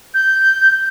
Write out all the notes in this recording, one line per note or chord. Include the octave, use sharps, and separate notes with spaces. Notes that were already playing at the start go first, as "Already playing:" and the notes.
G6